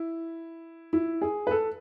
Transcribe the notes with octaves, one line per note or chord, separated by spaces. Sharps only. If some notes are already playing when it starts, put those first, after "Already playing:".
Already playing: E4
E4
G#4
B4
A4